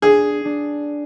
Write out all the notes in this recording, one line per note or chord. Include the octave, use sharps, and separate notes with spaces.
D4 G#4
D4